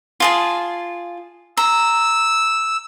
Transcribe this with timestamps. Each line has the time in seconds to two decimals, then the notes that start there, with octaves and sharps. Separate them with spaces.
0.20 F4 G#4 A5
1.57 A#5 E6